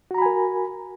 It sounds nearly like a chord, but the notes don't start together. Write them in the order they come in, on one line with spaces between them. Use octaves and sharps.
F#4 A#5 B5 G#5 A#4